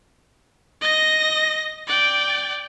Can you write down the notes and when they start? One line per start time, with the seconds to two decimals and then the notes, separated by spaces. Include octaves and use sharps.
0.82 D#5 A#6
1.87 D5 G5